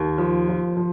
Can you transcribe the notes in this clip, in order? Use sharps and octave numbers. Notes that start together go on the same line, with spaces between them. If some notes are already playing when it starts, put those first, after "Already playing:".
Already playing: D#2
F3
F3
F3